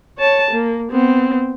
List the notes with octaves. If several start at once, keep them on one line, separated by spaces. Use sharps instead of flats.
C#5 A5
A#3
B3 C4